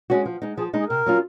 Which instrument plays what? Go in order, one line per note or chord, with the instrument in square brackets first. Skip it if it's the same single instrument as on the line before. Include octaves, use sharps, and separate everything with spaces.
[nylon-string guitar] G#3 C#4 F#4
F3
G#3 D#4
[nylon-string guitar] F3 [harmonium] G#4
[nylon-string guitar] G#3 D#4
[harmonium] G#4
[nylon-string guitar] C3 [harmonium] A#4
[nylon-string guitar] F#3 C#4 F4